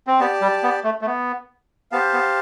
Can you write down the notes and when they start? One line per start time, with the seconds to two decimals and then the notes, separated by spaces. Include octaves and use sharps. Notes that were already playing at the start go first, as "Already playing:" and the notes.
0.07 C4
0.19 B3 G4 D5 A5
0.41 G3
0.63 B3
0.84 A3
1.01 A3
1.06 B3
1.92 B3 G4 C5 F5 A5
2.13 B3